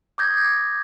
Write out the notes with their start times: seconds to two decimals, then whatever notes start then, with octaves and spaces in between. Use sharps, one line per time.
0.18 D6 D#6 G6 G#6 A#6